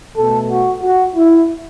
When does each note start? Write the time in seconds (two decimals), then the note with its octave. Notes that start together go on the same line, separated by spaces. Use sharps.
0.17 B2 A3 A4
0.50 F#4
0.82 F#4
1.16 E4